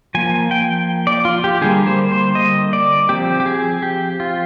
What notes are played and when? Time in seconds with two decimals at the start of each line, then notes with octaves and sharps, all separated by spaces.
0.15 F3 A#3 G#5
0.51 G5
1.07 D5
1.25 F4
1.44 G4
1.61 D3 G3 A#3 G#4
1.87 C5
2.12 C5
2.35 D#5
2.73 D5
3.09 F3 C4 G4
3.40 G4
3.46 G#4
3.82 G4
4.20 F4